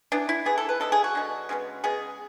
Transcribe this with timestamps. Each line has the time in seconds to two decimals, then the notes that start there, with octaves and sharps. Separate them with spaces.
0.12 E3 B3 D4
0.29 E4
0.46 E3 B3 G#4
0.58 A4
0.69 B4
0.80 D3 G#3 B3 A4
0.92 G#4
1.04 F#4
1.15 D3 G#3 B3
1.49 C#3 G#3 B3
1.84 C#3 G#3 B3 G#4